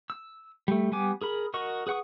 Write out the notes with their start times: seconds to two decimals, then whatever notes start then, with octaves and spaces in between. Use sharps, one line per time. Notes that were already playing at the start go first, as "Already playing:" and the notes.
0.10 E6
0.68 G3 A3
0.92 G3 B3 G#5 D6
1.21 G#4 A#4 B5
1.54 F#4 A#4 D#5 C#6
1.87 G#4 B4 F#5 C#6 D#6